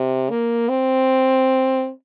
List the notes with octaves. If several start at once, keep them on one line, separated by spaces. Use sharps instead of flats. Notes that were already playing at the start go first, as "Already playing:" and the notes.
Already playing: C3
A#3
C4